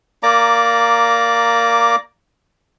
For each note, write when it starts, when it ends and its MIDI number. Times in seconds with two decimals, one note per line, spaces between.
0.23 1.96 58
0.23 1.96 74
0.23 1.96 82
0.23 1.96 86